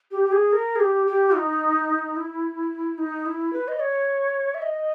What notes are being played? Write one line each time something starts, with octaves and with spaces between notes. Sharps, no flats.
G4
G4
G#4
A#4
G#4
G4
G4
D#4
E4
D#4
E4
B4
D#5
C#5
E5
D#5